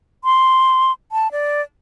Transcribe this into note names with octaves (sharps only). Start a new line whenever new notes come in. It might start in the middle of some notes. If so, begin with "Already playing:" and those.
C6
A5
D5